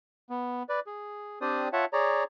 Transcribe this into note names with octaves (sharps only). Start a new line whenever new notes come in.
B3
B4 D5
G#4
C4 D4 G4 C5 D5 D#6
F4 C#5 E5 F#5 A5
G#4 C#5 D5 A#5